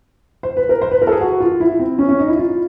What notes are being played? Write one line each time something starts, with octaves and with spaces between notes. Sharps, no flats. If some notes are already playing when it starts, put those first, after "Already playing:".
C5
B4
A#4
C5
B4
A#4
A4
G#4
F#4
F4
E4
C4
C#4
C#4
D#4
E4
F4